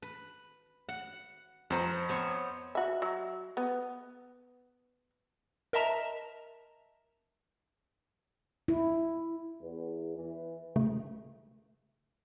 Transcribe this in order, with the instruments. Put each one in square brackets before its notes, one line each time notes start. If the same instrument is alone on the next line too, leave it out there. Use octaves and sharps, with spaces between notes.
[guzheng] B4
F#5
[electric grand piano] F2 A#5 [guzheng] B4 C5 F#5
[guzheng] B3 C5 C#5
[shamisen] F#4 E5
F#3
B3
[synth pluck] A#4 D#5 E5 A5 A#5
[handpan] E4
[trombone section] E2
E3
[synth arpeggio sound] C#3 A3